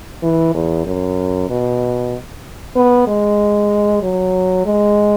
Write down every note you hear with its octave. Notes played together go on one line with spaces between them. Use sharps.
E3
E2
F#2
B2
B3
G#3
F#3
G#3